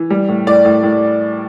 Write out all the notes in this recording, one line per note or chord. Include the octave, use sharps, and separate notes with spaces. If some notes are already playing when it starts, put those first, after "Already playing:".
Already playing: E3
G3
A2
A2 D5
A2
A2